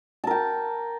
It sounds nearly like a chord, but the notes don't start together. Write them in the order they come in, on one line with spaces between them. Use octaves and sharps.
A5 A#4 G5